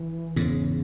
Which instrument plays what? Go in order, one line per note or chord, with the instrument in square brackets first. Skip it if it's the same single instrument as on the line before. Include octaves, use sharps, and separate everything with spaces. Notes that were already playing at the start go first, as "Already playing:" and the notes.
Already playing: [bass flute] E3
[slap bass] E2 G#2 [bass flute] C#3